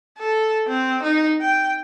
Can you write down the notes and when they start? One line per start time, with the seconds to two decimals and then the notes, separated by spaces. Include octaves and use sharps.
0.19 A4
0.68 C4
1.03 D#4
1.41 G5